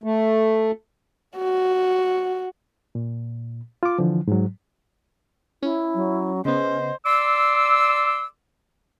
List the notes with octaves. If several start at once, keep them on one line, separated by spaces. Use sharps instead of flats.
A3
F#4
A#2
F4 D6
D3 E3 F3
G#2 F#3
C#4 E4
F#3
C#3 B3 C#4 C5 D#5
D5 C6 D6 E6